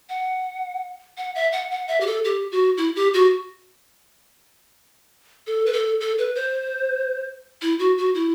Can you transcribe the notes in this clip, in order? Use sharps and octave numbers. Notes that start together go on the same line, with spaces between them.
F#5
F#5
E5
F#5
F#5
E5
G4
A4
G4
F#4
E4
G4
F#4
A4
B4
A4
A4
B4
C5
E4
F#4
F#4
E4